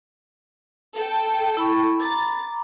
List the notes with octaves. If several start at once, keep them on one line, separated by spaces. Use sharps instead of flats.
A4 G5
E4 B5 C#6
A#5 B5 D6 A6